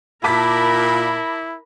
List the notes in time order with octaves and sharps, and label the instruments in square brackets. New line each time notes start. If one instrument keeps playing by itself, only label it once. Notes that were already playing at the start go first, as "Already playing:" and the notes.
[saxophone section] A#2 [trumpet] E4 [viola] A#4 B5 [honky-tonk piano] A5 D6 B6